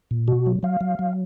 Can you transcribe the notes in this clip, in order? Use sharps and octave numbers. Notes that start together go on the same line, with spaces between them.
A#2
B2 F#4
F#3
F#3 F5
F#3
F#3